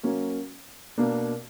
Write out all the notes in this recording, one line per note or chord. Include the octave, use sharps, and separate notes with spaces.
F#3 A#3 C#4
B2 A#3 D4